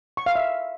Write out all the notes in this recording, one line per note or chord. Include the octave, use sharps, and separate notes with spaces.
C#6
F5
E5